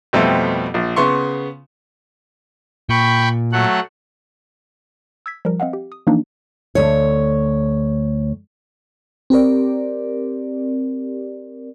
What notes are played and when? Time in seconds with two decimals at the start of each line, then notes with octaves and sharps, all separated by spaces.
0.13 F2 B2 G3 A3 C4
0.74 A#1
0.96 C#3 B3 C6 C#6
2.89 A#2 G5 B5 C#6
3.52 F#3 A3 F#5
5.26 E6 G#6 B6
5.45 F3 G3 A#4
5.60 C4 D#5 F5 F#5
5.73 G4
5.92 D#6
6.07 E3 F3 A#3 D4 D#4
6.75 D2 C#5
9.30 C4 G4 A#4 D5